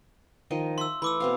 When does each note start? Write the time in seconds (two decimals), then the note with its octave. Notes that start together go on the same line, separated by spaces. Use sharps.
0.51 D#3 F3 D#5
0.78 E5 C6 E6
1.02 E3 A3 B5 D6 E6
1.20 B2 C4 F5